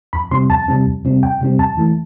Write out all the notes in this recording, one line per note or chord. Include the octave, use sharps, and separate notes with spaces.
F2 B5
C3 G3 C4 C6
F2 A5
C3 G3 C4
F2
C3 G3 C4
F2 G5
C3 G3 C4
F2 A5
E3 A3